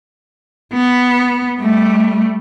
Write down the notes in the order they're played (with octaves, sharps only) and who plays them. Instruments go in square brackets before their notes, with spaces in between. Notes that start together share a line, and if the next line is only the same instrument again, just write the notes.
[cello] B3
G3 A3